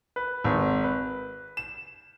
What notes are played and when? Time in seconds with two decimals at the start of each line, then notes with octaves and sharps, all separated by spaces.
0.16 B4
0.44 G#1
0.84 B4
1.57 E7